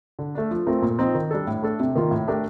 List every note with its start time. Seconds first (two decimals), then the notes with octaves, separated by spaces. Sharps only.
0.19 D3
0.35 A3 D4
0.51 F3
0.66 A3 C4 F4 A#4
0.82 A#2
0.99 F3 C4 D#4
1.15 D#3
1.31 G3 D4 A4
1.47 A2
1.62 A3 D4 A4
1.80 C3
1.95 D#3 A#3 F4
2.11 A2
2.27 A3 D4 G4 A#4